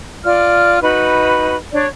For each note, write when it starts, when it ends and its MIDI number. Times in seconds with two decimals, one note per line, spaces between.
0.24 0.79 65
0.24 0.79 74
0.24 0.79 89
0.82 1.56 63
0.82 1.56 66
0.82 1.56 71
0.82 1.56 83
1.72 1.85 62
1.72 1.85 73
1.72 1.85 74